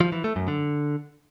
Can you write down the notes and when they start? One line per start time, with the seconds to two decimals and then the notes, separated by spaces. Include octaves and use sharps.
0.01 F3
0.12 E3
0.24 A3
0.36 F#2
0.48 D3